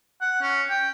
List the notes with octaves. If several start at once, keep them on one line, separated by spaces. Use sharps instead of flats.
F#5
C#4
G5